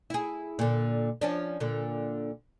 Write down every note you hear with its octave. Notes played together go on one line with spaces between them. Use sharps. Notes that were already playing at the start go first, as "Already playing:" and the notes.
E4 G#4
A#2 D3
F3 C#4 D4
A#2 D3